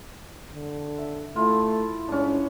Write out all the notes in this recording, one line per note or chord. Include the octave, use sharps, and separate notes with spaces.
D3
E5
A3 E4 F4
G#2 C#4 D4